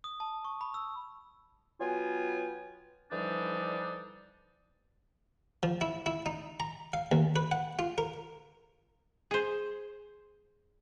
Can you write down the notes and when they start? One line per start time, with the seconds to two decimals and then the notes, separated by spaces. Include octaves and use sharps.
0.04 D#6
0.20 A5
0.45 C#6
0.61 B5
0.74 E6
1.81 F#3 B3 F4 G5 G#5
3.12 D3 E3 F3 G3 D4 D#4
5.63 F3
5.81 E4
6.06 E4
6.26 D#4
6.60 A#5
6.93 F5
7.12 D#2
7.36 B4
7.52 F#5
7.79 F4
7.98 A#4
9.31 G#4 C5